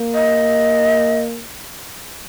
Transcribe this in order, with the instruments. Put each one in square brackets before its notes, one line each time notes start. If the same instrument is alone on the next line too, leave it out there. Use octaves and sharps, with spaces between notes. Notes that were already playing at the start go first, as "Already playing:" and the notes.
Already playing: [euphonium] A#3
[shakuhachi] D#5